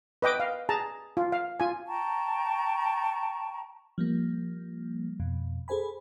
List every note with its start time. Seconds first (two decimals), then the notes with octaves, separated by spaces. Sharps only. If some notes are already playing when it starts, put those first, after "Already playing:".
0.22 B4 D#5 G5 D6
0.40 F5
0.69 G#4 A5 A#5
1.17 F4
1.32 F5
1.60 F4 G#5
1.87 G5 A5 A#5 C#6
3.98 F3 G3 A#3
5.20 F2 B2
5.68 G#4 A4 C5 G#5 B5